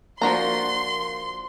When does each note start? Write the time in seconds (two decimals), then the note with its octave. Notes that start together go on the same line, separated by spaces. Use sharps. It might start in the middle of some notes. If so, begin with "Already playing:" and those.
0.22 F3 A#3 D4 F#4 A#5 C6